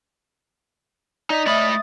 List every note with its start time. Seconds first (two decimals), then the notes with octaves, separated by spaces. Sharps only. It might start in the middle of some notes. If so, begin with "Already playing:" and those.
1.30 D#4 D5 D#5 B6
1.47 A3 E5 B5 D#6 A6